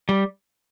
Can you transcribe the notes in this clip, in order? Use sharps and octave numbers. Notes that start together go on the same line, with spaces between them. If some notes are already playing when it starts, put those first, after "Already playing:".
G3